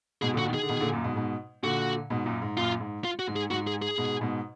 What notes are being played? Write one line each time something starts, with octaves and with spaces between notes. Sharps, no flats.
G#2 B2 G#4
A#2 D3
F#4
B2 D#3
G#4
D3
B2 D#3
A#2 D3
F#2 A#2
G#2 B2
G#2 B2
A#2 D3 F#4
G#2 B2
F#2 A#2
G#2
F#2 A#2 F4
G#2
F4
F#4
G#2
G#4
G#2 F#4
G#4
G#4
G#2 B2
G#2 B2